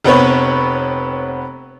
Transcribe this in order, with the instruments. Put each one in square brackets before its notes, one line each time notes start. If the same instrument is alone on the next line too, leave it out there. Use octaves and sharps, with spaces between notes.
[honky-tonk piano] F1 B3 C4 B4 C#5